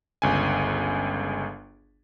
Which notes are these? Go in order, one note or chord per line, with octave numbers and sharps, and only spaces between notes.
G1 C#2 G#5